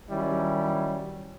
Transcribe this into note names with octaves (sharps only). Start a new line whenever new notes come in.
D#3 F#3 G3 C#4 E4